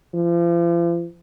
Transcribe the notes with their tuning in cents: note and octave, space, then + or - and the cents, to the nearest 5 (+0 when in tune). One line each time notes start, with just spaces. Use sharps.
F3 -40